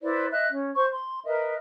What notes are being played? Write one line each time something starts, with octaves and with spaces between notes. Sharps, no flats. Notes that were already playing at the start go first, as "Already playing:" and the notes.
E4 B4 C5 D5
D#5 E5 F#6
C#4
C5 C#6
C6
A#4 B4 D#5 E5